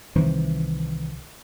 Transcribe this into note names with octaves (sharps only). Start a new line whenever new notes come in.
C2 D#3 E3 C4